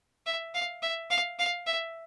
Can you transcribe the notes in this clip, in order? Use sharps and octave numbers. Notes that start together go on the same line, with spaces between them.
E5
F5
E5
F5
F5
E5